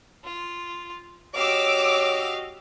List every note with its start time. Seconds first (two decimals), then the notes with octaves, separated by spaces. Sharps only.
0.24 F4
1.35 F#4 G4 C#5 D#5 F5 D6 E6